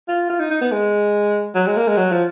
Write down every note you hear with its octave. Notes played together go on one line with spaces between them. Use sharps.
F4
F4
D#4
D#4
B3
G#3
F#3
G#3
A#3
G#3
F#3
F3